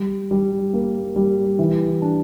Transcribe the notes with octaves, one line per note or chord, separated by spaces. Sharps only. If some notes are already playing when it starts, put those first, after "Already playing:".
Already playing: G3
G3
A#3
G3
E3
D4